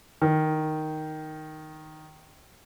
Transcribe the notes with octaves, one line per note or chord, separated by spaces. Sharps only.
D#3